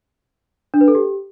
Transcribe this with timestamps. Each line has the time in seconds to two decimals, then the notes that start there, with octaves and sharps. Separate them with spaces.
0.74 D4
0.81 B4
0.88 A4
0.95 G4